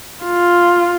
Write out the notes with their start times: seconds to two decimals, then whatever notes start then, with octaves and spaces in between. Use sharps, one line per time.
0.25 F4